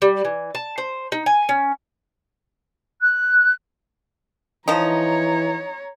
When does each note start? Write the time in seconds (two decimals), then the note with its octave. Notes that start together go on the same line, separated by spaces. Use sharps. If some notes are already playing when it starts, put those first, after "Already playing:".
0.02 G3
0.25 E3
0.55 A5
0.78 C5
1.12 D#4
1.26 G#5
1.49 C#4
3.01 F#6
4.68 E3 F3 D#4 C#5 A#5